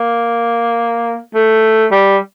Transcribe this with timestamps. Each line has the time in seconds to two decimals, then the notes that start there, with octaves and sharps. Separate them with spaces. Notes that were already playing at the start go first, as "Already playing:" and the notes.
Already playing: A#3
1.35 A3
1.91 G3